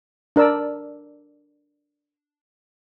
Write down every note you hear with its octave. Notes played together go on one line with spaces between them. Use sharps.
D4 A#4 D5 E6